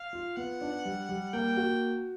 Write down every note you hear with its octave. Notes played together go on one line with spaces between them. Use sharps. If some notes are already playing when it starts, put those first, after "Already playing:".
Already playing: F5
F4
B3 F#5
D4
G3
G3
A#3 G5
F#4